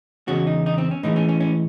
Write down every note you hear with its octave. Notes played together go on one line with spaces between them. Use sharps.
E2 C#3 G#3 F#4
D#4
D#4
C4
C#4
A2 E3 G#3 D#4
C#4
C#4
C#4